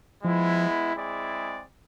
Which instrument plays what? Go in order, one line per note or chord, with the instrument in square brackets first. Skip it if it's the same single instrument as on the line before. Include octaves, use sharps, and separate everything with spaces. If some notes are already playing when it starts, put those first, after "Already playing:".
[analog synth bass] F3 [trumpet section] G#3 B3 E4
[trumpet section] G#3 C4 E4 G#4 D5